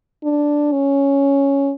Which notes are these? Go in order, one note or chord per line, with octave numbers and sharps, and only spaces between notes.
D4
C#4